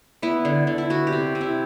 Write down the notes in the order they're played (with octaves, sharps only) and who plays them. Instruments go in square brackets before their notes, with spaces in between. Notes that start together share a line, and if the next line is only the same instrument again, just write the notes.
[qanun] B3 E4
D3
D3
E4
B3 F#4
G4
C3
C3
E4